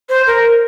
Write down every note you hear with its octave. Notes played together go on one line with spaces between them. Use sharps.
C5
A#4